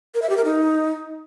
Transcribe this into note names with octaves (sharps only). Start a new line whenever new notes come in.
A#4
E5
G4
A#4
D#4